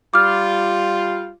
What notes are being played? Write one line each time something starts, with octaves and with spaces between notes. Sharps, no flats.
G3 F4 D6 F6